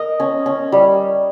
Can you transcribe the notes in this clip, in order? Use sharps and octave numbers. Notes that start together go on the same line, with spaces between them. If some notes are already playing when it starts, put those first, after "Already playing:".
Already playing: A#4 D#5
C#4
C#4
G3